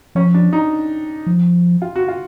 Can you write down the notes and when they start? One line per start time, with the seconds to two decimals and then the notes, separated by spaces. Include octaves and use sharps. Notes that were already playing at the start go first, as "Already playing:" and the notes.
0.15 F3 C#4
0.34 D4
0.53 D#4
1.27 F3
1.82 F4
1.96 F#4
2.08 F4